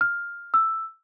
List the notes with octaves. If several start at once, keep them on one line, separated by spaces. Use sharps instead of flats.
F6
E6